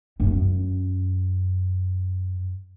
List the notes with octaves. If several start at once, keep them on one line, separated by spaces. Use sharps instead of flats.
F#2 C#4